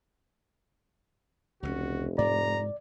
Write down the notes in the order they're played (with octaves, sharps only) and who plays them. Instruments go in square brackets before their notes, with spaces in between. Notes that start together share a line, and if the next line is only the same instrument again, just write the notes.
[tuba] F1 [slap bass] C#2 F#3 C#4 [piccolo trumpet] F#4
[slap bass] G#2 [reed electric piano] D5 [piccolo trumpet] A#5